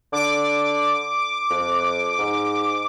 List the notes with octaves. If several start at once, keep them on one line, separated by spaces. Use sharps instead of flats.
D3 D6
F2
G#2